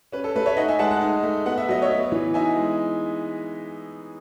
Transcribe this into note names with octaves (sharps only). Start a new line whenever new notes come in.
C#4 B4
A4
A3 B4
C#5 E5
D#4 D#5 F#5
E5 G#5
G#3 F#5 A5
F#5 A5
D#4
A3
B3 F#5
E5
F#3 D#5
C#5 E5
B3
E3
D#4 E5 G#5
G#3